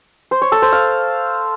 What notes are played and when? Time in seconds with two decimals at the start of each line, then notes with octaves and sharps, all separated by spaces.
0.31 C5
0.42 C#5
0.52 A4
0.62 C5
0.72 F5